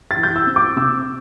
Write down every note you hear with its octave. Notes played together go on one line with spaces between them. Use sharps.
A6
E3
G6
E6
C4
D6
C3 E6